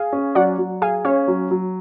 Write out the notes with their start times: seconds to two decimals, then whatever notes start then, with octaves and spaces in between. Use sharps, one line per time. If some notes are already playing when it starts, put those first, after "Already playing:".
Already playing: G#4 F5 G#5
0.13 C#4
0.35 F#3 D5 F#5
0.58 F#3
0.82 G#4 F5 G#5
1.05 C#4 C#5 F5
1.28 F#3
1.51 F#3